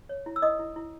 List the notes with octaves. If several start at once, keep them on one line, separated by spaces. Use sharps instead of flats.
C#5
E4
E6
E4 D#5 D#6
E4
E4